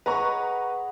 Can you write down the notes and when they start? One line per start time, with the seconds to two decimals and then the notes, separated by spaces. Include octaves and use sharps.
0.06 G#4 B4 D#5 F#5 A#5 C#6